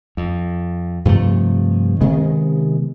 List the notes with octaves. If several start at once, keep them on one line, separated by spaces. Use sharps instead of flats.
F2
G2 C3 F3 A3
C3 D#3 G#3 B3